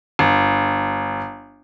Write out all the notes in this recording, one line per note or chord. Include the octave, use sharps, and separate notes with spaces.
G1